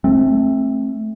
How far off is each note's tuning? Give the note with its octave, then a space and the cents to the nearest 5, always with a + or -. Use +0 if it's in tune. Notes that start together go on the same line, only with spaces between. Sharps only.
A3 -10 C4 +25